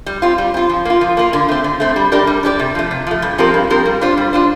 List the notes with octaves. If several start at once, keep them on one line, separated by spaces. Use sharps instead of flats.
G3
C4 F4
G3
C4 F4
F3
A#3 F4
F3
A#3 F4
D3
A3 C4
D3
A3 C4
G3
D4 G4 A#4 D5
G3
D4 G4 A#4 D5
C3
F3 A3
C3
F3 A3
G2
F3 C4 G4 A#4
G2
F3 C4 G4 A#4
G3
D4 F4 C5
G3
D4 F4 C5